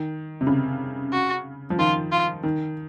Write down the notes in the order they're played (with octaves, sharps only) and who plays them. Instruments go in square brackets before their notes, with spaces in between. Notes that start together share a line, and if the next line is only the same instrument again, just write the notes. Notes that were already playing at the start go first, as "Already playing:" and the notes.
Already playing: [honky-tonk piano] D#3
C3
C#3
[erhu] F#4
[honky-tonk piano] F3
[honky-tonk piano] D#3 [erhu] F4
[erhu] F4
[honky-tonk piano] D#3